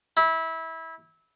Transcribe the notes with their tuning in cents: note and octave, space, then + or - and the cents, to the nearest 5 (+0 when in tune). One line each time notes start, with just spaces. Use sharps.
E4 -20